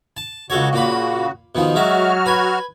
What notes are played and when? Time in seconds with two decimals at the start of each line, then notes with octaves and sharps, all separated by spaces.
0.17 A5
0.50 C#2 C#3 F#4 A4 C#5
0.73 A#2 A#3 B5
1.55 B2 D#3 F3
1.75 F#3 G#3 F#4 E5 F6
2.26 B4 G#5